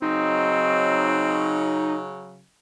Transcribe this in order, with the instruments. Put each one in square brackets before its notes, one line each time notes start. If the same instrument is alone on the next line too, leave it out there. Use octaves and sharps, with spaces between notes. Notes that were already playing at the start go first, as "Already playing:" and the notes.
[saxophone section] C#3 F#3 [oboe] C4 [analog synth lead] D#4